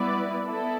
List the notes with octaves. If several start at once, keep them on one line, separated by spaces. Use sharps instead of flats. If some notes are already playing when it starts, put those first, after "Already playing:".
Already playing: G3 B3 E4 B4 D5
B3 E4 A4